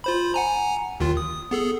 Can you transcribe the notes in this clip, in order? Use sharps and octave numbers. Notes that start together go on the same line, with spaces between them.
F4 C5 B5
F#5 G#5 A#5
D#2 D#3 F4
D#6
B3 G#4 A4